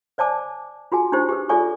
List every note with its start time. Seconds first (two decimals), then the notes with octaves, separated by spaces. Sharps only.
0.18 C5 D5 G#5 A5 D6
0.92 F4 F#4 G#4 G#5 A5
1.12 D4 D#4 F4 G4 C5
1.29 G4 G#4 B4
1.49 F4 G#4 A4 D5 G#5 C#6